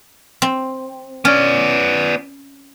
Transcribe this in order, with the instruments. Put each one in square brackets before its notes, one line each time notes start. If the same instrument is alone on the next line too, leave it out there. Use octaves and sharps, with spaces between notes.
[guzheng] C4
[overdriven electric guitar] B3 D5 [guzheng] C#4